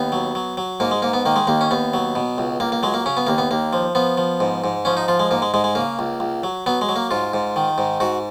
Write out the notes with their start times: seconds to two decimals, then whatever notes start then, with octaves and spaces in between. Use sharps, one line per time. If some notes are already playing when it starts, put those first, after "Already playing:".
Already playing: D#2 B3
0.12 F#3
0.35 F#3
0.57 F#3
0.80 G#2 A#3
0.91 G#3
1.02 G#2 A#3
1.14 B3
1.25 D#3 A#3
1.36 G#3
1.47 D#2 A#3
1.61 C#4
1.71 D#2 B3
1.94 F#3
2.15 B2
2.38 C#2
2.60 C#2 A#3
2.72 A#3
2.83 F#3 G#3
2.94 A#3
3.06 C#3 C#4
3.17 B3
3.27 D#2 A#3
3.38 B3
3.51 D#2 A#3
3.73 F3
3.95 F3 B3
4.18 F3
4.40 G#2
4.64 G#2
4.85 F3 C#4
4.97 D#4
5.08 F3 F4
5.19 G#3
5.31 G#2 A#3
5.42 G#3
5.54 G#2 G#3
5.64 G#3
5.75 C#3 A#3
5.99 C#2
6.20 C#2
6.43 F#3
6.66 F#3 B3
6.81 G#3
6.89 F#3
6.96 A#3
7.11 G#2 F4
7.33 G#2
7.56 D#3
7.78 G#2
8.00 G#2 F#4